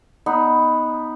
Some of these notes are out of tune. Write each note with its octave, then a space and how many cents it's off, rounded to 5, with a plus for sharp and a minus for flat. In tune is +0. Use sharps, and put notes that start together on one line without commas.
B3 +0 D#4 +10